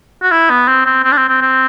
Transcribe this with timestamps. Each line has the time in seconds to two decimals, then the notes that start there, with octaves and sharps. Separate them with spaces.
0.22 F#4
0.31 E4
0.50 B3
0.68 C4
0.86 C4
1.04 C4
1.12 D4
1.17 C4
1.28 C4
1.41 C4